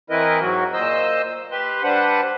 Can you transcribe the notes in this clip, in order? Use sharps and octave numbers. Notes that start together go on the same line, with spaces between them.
E3 C4 E4 A#4 B4 D#5
G#2 F#3 F#4
A#2 C5 D#5 E6
G4 B4 C6
G3 D4 B4 C5 F#5